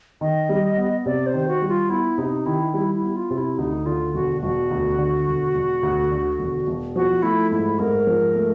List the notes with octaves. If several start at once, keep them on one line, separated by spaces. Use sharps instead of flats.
D#3 D#5
G3
B3
C3 D5
C5
D#3
F#4
G3
F4
B3 E4
C3 D#4
D#3 E4
G3 E4
E4
B3
F4
C3
E4
D2 D#4
D3 F4
E1 F#4
E1 F#4
D2
D3
E1
E1
D2
D3
E1
E1
F3 F#4
A3 E4
G#2 E4
G#2 A#4
F3
A3